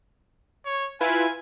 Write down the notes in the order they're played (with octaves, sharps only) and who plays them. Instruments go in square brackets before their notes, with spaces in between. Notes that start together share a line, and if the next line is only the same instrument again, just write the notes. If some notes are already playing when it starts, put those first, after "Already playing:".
[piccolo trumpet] C#5
[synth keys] E4 F4 B4 [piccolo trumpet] G#5